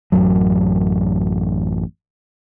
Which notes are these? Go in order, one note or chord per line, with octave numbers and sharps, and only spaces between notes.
A1 F#2 F#3